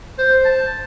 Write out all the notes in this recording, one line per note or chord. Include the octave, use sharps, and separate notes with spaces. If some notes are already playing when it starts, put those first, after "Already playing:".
C5
A5